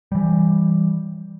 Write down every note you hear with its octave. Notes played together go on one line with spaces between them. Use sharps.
E3 G3